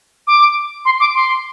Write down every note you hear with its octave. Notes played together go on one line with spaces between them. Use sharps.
D6
C6
D6
C6